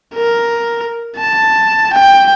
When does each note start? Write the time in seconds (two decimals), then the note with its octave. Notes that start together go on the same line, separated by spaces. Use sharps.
0.15 A#4
1.17 A5
1.92 G5